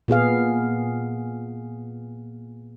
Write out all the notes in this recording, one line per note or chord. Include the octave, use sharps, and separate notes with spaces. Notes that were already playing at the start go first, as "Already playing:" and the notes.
A#2 B3 G#4 F5